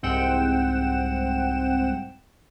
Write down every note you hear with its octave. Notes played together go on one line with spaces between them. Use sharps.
C2 G#2 C4 F#5 G5 E7